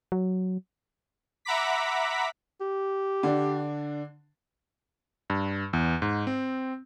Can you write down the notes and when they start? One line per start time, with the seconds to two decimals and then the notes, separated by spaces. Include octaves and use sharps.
0.12 F#3
1.45 E5 F#5 A#5 B5 D6 B6
2.61 G4
3.23 D3 D4
5.30 G2
5.73 E2
6.02 G#2
6.27 C4